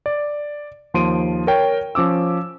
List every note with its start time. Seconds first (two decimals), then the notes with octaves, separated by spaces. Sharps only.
0.06 D5
0.94 D#2 F3 C6 D7 D#7
1.47 A#4 C#5 G5
1.95 F3 C#4 D6 E6